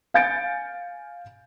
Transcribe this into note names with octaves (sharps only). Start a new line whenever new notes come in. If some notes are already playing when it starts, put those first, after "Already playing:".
F5 G#5 G6 A6 C#7 D7